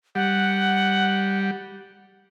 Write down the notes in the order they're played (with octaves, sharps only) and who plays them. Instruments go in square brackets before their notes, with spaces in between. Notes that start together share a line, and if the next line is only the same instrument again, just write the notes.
[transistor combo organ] G3 [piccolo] F#5